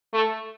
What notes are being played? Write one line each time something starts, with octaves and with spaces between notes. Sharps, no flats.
A3